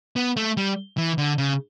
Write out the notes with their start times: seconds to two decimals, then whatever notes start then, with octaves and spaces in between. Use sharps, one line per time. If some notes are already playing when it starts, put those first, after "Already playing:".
0.16 B3
0.37 A3
0.57 G3
0.98 E3
1.18 D3
1.38 C#3